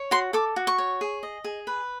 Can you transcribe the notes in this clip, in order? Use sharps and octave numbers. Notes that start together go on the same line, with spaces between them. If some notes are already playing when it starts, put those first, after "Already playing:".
Already playing: C#5
F#4 C6
A4 D6
F#4
C#6
C#5
G#4
D#5
G#4
B4